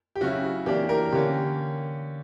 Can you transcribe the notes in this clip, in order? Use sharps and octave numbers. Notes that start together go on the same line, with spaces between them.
G4
C#3 F#3 C#4 E4 F#4
E3 A#3 D4 G4
A#4
D3 A#3 C#4 G4